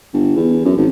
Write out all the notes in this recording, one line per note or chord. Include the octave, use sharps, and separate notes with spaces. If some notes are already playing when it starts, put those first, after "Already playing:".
G1
E2
F#2
G#1